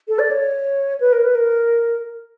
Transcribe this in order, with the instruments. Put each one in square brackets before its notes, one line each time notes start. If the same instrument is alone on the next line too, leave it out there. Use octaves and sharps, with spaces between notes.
[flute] A4
D5
C#5
B4
A#4
B4
A#4